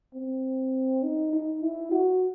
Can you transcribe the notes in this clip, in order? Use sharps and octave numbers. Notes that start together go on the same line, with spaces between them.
C4
D#4
D#4
E4
F#4